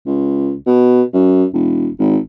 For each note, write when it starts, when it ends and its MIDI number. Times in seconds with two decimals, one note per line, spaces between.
0.06 0.55 37
0.66 1.03 47
1.13 1.45 42
1.54 1.89 28
1.99 2.18 32